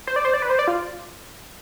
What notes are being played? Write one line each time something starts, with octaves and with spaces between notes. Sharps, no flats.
C5
D5
C5
D5
B4
C5
D5
F4